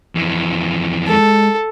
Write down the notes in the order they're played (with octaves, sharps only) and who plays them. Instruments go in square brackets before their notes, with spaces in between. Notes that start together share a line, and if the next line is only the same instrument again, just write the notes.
[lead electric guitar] F2 E3
[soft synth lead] G#3 [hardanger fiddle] A4